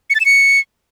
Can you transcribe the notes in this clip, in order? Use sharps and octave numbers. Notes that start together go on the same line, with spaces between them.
C#7
A6
E7
C#7